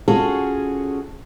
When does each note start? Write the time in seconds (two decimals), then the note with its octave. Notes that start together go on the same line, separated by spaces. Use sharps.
0.08 C#4 F4 F#4 G#4 A4 C#5